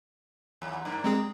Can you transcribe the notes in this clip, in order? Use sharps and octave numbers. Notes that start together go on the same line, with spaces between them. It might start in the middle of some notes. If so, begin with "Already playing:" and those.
D#2
G2 A#3 D4
G#3 C4 G#4